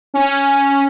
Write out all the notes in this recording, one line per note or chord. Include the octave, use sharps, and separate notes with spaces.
C#4